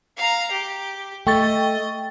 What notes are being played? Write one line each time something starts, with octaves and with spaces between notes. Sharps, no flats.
F5 A#5
G4
A3 D#5 G5 C#6 A6